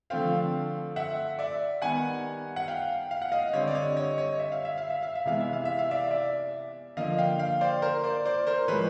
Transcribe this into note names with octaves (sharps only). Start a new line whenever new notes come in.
D3 F3 A3 C4 F5 G5
E5 F#5
D5 E5
D#3 G3 B3 F#5 G#5
F#5
F5 G5
F5
F#5
D#5 F5
D3 G3 C4 C#5 D#5
D5
C#5 D#5
C#5 D#5
C#5 D#5
E5
F5
E5
F5
E5
F5
E5
C3 E3 G#3 B3 F5
E5
F5
E5
F5
D5 E5
D5 E5
D3 F3 A#3 D#5 F5
F5 G5
F5 G5
C5 D5
A#4 C5
C5 D5
C5 D5
A#4 C5
A2 F3 G#3 B4 C#5